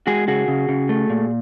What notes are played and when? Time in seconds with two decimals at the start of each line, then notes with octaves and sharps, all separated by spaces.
0.07 G#3 F#4 G#4
0.28 C#3 F#4 G#4
0.48 C#3
0.69 C#3
0.89 A3
1.10 A#2